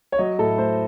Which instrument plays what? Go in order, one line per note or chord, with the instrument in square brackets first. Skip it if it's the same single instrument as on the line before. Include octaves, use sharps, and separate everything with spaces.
[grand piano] C#5
F#3 D#5
A2 A4
A3 C5